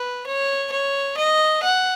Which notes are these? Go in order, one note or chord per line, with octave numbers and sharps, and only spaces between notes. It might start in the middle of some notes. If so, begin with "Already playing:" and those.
Already playing: B4
C#5
C#5
D#5
F#5